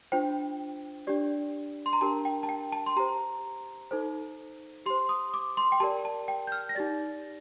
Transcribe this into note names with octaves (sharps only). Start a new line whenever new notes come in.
D4 F4 C5 G5
D4 G4 D5
C6
A#5
D4 G4 A#4 A5
G5
A5
G5
A5
C6
G4 C5 A#5
D#4 A4 C5
G4 C5 C6
D#6
D6
C6
G5
G4 A#4 D5 A5
A5
G5
G6
F6
A#6
D#4 G4 D5 A6